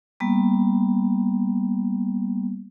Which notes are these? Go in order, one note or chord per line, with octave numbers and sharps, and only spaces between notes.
G3 A#3 B3